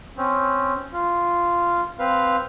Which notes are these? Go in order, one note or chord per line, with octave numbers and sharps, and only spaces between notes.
C4 C#4
F4
C4 B4 F5